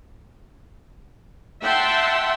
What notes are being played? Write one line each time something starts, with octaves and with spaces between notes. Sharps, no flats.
E5 F#5 G5 A5 C6